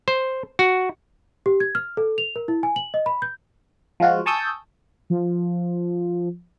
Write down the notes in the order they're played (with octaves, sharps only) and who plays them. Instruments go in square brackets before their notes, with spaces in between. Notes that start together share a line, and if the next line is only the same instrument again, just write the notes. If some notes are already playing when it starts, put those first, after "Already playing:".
[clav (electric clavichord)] C5
F#4
[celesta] G4
G#6
F6
A4
F7
A#4
E4
G#5
F#7
D#5
B5
G6
[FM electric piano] F3 G#3 F4 F#4
G#5 A5 C#6 D#6 E6 G6
[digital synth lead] F3